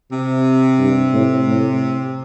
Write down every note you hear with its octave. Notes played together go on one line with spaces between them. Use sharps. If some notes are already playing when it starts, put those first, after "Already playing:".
C3
G2
A2
A2